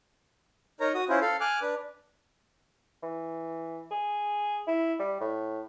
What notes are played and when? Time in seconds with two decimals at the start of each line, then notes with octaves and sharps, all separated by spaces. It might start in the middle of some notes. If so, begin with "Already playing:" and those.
0.80 D#4 A#4 C#5 A#5
0.95 F#4 D#6
1.09 C#4 E4 F4 C5
1.21 A4 F5
1.40 G#5 D6 F6 F#6
1.62 D4 B4
3.03 E3
3.91 G#4
4.67 E4
4.99 G3
5.20 A2